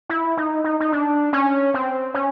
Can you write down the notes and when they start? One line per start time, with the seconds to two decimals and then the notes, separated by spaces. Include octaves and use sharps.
0.09 E4
0.37 D#4
0.64 D#4
0.80 D#4
0.92 D4
1.33 C#4
1.74 C4
2.14 C#4